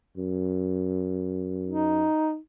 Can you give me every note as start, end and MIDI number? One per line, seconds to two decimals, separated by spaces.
0.17 2.08 42
1.67 2.38 63